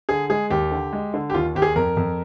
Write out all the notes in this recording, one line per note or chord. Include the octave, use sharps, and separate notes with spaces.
D3 G#4
G#3 G#4
D#2 G4
D3
G#3
D3
G4
D#2 F4
D#2 G4
G#4
F2 A#4
F2